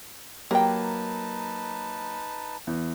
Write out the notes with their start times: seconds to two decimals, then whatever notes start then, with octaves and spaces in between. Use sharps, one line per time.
0.51 F#3 A#3 D#4 G4 B4 G5 A5
2.67 E2